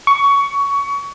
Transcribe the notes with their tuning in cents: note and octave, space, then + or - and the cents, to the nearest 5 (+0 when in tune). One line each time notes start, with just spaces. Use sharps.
C#6 +20